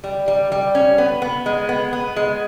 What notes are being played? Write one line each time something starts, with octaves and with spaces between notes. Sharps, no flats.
G3
G3
G3
C#4
B3
B3
G#3
B3
B3
G#3